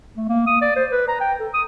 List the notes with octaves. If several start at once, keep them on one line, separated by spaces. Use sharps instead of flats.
A3
A#3
D#6
D5
C5
B4
A#5
G5
A4
D#6